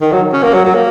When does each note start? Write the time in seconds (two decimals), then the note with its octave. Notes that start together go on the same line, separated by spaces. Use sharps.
0.01 D#3
0.12 F#3
0.33 C#4
0.43 A#3
0.54 F#3
0.65 F#3
0.75 A#3